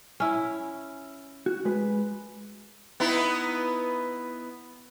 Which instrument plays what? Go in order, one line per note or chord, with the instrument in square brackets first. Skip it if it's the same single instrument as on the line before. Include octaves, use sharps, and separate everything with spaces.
[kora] C#4 E4
[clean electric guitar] F#4
G#3 B4
[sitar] B3 D#4 E4